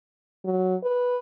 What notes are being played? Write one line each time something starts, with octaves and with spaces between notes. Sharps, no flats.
F#3
B4